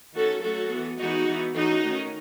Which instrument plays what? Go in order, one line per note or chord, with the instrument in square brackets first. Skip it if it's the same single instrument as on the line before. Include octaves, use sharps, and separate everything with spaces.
[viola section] D#3 A3 C#4 F#4 A4
F#3 A3 C#4 F#4 A4
E3 B3
E3 G#3 B3 D#4 F#4
E3 B3
E3 A3 C#4 D#4 F#4
D#3 A3 C#4